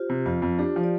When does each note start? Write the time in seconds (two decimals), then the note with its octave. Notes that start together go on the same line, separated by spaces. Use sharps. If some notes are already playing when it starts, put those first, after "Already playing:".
Already playing: F4 G4 C5
0.09 C3
0.26 F2 F4
0.42 F2
0.59 D4 G4
0.76 F3
0.83 D5